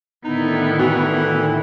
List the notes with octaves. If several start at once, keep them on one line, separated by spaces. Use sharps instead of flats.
A2 D3 D#3 B3 D#4 E4
E3 F#4